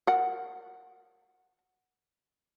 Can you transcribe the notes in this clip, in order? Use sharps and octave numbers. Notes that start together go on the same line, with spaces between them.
A#4 F#5